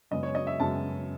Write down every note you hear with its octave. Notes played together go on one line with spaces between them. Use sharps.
F#2 C#3 G#3 B3 D#5
C#5
D#5
E5
F#2 C#3 G#3 B3 A5